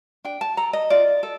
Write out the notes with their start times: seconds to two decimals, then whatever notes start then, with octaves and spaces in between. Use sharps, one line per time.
0.24 D4 G5
0.41 A5
0.57 A4 A#5
0.73 D#5
0.90 F4 D5
1.23 A4